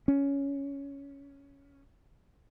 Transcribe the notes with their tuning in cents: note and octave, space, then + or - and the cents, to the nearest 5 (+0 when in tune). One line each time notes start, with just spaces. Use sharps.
C#4 +10